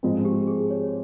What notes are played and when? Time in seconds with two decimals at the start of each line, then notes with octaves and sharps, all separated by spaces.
0.03 G#2 F3 G#3 C4 F4
0.25 G4
0.47 G#4
0.70 C#5